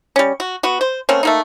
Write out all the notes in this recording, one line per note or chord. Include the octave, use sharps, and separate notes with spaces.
G3 C#4
F#4
B3 F#4
C5
A3 A#3 C4 C#4
A3 A#3 D#4